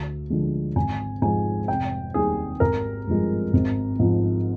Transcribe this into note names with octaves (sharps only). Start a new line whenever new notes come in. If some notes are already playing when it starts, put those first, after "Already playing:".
Already playing: D2
D3 F3 G#3
G#1 G#5
G#2 F3 G#3 G#5
F1 G5
D#2 D#3 G3 G#4
G#1 A#4
G2 F3 G#3
G#1
G#2 F3